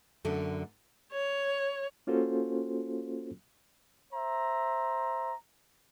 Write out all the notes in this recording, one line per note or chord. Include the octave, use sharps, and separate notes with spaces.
F#2 D3 A3
C#5
A#3 C#4 F4 F#4 A4 C5
C5 E5 A#5